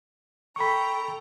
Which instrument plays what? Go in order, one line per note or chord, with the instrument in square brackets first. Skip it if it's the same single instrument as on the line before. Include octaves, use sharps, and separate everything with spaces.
[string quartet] A4 G5 A#5 [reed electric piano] B5 C#6